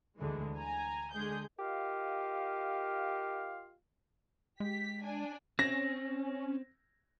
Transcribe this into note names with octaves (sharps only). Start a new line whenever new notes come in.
D2 D3 E3 G#3
G#5 A#5
D3 G#3 G#4 G6
F4 G4 A#4 D#5 F5
G#3 G4 B6
D4 G#5
C4 C#4 A#6